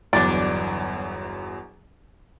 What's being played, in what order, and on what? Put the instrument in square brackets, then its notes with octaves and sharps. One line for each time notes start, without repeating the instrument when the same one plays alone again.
[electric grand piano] G1 E2 F#3 [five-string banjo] D4 D5